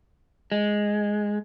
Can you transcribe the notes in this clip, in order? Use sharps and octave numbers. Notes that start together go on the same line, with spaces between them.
G#3